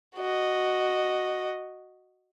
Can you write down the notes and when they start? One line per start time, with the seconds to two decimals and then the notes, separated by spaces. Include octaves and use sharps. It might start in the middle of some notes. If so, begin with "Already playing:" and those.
0.16 F#4 D#5